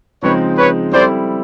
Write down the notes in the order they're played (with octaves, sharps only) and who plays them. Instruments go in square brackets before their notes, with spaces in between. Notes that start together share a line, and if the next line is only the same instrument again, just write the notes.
[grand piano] C#3 F3 G#3 C4 D#4 [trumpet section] B4 C#5
[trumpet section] B4 C#5
[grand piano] G3 C4 E4 A4 [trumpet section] C5 D5